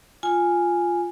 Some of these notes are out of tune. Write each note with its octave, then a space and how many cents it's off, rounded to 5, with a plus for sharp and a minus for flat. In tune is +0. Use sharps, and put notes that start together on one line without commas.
F4 +0 G#5 +0